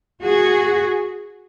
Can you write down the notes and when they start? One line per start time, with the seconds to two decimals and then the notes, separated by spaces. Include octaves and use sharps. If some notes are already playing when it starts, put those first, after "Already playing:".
0.23 F#4 G#4